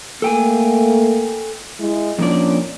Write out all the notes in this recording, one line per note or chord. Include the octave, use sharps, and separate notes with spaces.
A3 A#3 A4 G5 G#5
G#3 E4
F2 A#2 C#4 D4 D5